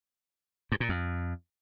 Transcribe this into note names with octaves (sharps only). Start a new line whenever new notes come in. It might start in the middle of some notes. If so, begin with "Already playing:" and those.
G2
A#2
F2